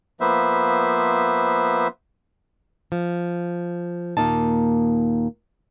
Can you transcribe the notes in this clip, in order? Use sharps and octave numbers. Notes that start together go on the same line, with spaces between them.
F3 A#3 B3 B4 C5 E5
F3
D#2 A#2 A#3 D#4 A5